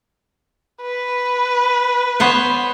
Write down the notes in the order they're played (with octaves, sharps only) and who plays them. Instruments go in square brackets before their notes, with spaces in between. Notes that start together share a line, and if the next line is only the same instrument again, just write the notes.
[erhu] B4
[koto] B3 C5 C#5